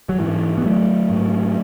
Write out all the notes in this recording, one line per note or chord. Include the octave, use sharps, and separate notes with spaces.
F#3
G#2 E3
B3
F#3 A3
G#2